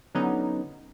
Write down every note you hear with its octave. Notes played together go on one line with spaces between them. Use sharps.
D3 F#3 B3 C#4 D#4